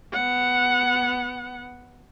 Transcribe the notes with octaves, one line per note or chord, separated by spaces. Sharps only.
B3 F#5